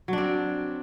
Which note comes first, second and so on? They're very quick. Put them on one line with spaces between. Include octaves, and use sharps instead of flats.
F#3 D4 C4